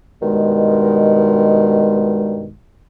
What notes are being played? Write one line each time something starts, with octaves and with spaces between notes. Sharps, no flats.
G2 B2 D#3 G#3